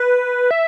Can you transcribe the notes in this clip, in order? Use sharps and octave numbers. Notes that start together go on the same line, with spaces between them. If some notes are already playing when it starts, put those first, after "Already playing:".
Already playing: B4
E5